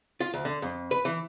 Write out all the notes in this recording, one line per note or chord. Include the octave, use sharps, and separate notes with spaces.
F4
D2
D3
F2
B4
E3